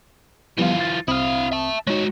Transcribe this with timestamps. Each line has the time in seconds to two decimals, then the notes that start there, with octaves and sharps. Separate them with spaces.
0.59 E3 F3 G3 B3 F4
0.81 A6
1.08 C2 C4 E4 F5 D#6
1.52 E5 A5
1.87 G#3 D#4 F#4 C#5